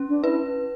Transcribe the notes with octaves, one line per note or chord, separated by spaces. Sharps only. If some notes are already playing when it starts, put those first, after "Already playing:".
Already playing: C#4
D4
E4 B4